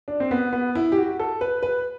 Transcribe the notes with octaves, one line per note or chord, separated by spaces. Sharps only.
D4
C4
B3
B3
E4
G4
F#4
A4
B4
B4